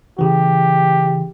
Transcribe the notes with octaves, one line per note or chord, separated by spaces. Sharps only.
C#3 E3 G4